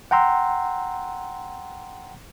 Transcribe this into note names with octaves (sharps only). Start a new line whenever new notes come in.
F#5 G5 A#5 C6 E6